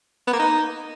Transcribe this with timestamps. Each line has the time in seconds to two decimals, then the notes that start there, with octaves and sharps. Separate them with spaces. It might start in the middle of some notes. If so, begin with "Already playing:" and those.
0.27 B3
0.33 A#3
0.39 D#4